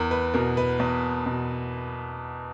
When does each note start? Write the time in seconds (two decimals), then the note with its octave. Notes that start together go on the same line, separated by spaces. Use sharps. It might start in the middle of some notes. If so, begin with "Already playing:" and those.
Already playing: E2 A#4
0.11 B4
0.34 B2 A#4
0.57 B4
0.80 E2
1.26 B2